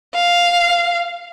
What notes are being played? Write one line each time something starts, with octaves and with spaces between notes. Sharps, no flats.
F5